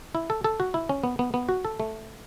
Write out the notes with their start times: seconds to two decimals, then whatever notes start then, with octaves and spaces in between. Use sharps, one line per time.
0.15 E4
0.30 A4
0.44 A4
0.60 F#4
0.74 E4
0.89 C#4
1.04 B3
1.19 B3
1.34 B3
1.49 F#4
1.65 A4
1.80 A3